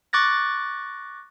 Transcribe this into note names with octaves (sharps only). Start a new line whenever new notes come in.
C#6 D6 F#6 A6 A#6